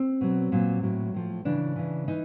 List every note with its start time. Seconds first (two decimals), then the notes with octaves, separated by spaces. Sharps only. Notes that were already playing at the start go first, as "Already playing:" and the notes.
Already playing: C4
0.21 B2 F#3
0.52 A#2 F#3
0.83 A2 F#3
1.14 A2 F3
1.45 C#3 E3 D4
1.76 C#3 E3
2.08 E3 D#4